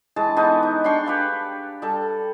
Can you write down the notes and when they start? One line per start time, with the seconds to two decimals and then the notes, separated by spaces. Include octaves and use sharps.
0.16 E3 G#3 A5
0.37 E3 B3 D#4
0.63 D#4
0.84 D4 G5 C6 C#6
1.06 G4 B4 F5
1.82 G3 A4